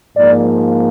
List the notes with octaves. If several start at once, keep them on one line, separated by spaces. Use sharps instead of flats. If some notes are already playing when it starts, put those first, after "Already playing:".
G#2 F3 A#3 D5